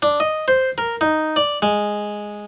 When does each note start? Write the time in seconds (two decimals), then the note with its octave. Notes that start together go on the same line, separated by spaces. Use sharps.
0.02 D4
0.20 D#5
0.48 C5
0.78 A#4
1.01 D#4
1.36 D5
1.62 G#3